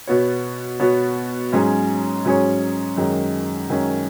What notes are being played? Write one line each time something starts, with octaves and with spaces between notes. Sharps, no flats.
B2 B3 F#4 C#5
B2 B3 F#4 C#5
G#2 F#3 C#4 G#4 C#5
G#2 F#3 C#4 G#4 C#5
F#2 D#3 G#3 C#4
F#2 D#3 G#3 C#4